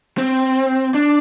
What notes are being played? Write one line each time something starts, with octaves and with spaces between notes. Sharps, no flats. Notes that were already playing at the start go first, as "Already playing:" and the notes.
C4
D4